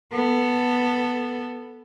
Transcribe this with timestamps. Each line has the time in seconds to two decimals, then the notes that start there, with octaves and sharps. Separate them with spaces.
0.12 B3 A4